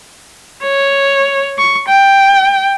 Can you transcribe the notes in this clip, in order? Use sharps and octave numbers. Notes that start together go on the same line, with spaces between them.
C#5
C#6
G5